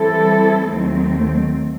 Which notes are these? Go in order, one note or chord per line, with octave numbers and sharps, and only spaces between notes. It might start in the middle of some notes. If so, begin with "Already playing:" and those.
Already playing: E3 G3 C4 E4 A4
D#2 D#3 F#3 A3 C4